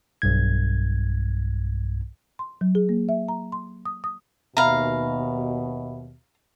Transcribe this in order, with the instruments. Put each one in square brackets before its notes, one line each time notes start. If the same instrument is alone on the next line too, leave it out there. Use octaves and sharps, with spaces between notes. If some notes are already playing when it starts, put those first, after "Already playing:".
[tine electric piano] B1 G2 G#6
[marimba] C6
F#3
G#4
A#3
E5
A#5
C6
D#6
D#6
[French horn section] D#2 B2 [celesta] E5 B5 [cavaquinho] F5 A#5